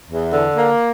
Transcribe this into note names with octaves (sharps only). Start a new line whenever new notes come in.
E2
D3
A#3